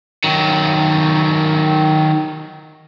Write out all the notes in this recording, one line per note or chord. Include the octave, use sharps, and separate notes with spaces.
D#3 F#3